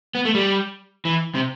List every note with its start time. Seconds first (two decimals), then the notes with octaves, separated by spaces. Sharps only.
0.15 B3
0.25 A3
0.35 G3
1.05 E3
1.35 C3